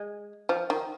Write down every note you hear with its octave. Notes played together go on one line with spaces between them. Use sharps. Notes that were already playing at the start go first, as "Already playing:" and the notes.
Already playing: G#3
F3
D#3